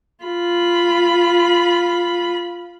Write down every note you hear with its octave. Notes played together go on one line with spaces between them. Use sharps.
F4 B5